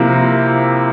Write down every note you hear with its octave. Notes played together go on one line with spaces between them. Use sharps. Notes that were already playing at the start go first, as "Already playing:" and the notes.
Already playing: C3 F3 A#3 E4